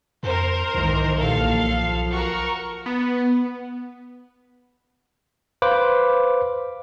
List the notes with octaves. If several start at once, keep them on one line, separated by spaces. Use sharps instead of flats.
F2 A#4 C5
B1 G#2 D#3 E3
A#1 D#2 A4 F5
F3
F#4 A#4 C#6
B3
B4 C5 F5 B5 D6